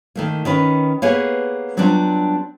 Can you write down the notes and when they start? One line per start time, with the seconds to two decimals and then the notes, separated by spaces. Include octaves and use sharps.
0.15 D#3 A3 A#3
0.45 D#3 C#4 B4
1.02 A#3 B3 G4 G#4 B4 C#5
1.77 F#3 G3 B3 D4 F4